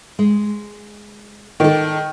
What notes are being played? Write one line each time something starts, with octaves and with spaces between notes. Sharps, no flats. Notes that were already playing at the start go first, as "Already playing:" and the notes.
G#3
D#3 A4 D5